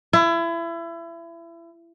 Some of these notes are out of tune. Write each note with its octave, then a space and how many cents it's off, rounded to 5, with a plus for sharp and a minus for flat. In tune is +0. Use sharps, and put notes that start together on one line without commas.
E4 +30